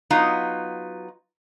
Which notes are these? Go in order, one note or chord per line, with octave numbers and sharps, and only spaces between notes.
F#3 B3 D#4 F4